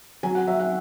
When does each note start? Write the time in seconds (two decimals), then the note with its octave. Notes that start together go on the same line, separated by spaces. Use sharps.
0.23 F#3 G#5
0.35 F#5
0.47 F#3 E5
0.60 F#5